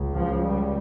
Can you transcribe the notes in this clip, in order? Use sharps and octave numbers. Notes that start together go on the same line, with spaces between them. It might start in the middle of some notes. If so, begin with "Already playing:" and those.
Already playing: C#2 C#3
F3
G3